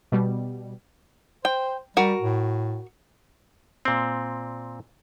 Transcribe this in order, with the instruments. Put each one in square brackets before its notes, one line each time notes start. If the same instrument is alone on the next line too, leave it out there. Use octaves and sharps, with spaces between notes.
[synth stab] B2 G3
[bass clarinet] C5 [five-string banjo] G5
[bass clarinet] G3 [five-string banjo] F#4 A#4
[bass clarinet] A2
[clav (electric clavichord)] A#2 C4